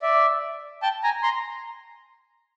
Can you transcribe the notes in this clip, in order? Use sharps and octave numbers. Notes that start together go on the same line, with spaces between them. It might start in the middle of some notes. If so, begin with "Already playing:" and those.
D5 E5
G5 A5
G#5 A#5
A#5 C6